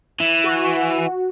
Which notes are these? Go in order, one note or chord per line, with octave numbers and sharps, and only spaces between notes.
E3
F#4